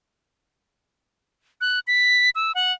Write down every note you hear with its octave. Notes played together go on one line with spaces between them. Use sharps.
F#6
B6
E6
F#5